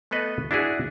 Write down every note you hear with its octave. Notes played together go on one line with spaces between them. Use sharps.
A3 B3 A4 B4 D#5
D4 E4 F#4 G#4